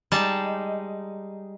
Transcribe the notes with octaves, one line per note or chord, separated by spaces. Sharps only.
G3 G#3 D#4 A5